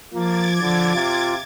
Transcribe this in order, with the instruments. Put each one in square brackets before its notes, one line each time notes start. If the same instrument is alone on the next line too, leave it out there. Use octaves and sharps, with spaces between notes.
[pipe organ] F3 [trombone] A#3 [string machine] D6 G#6 A6
[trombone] D3 [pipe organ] F3
[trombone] C3 [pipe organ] F4